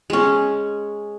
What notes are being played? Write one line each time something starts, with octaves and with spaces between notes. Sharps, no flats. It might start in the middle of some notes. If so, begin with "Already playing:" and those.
G#3 C#4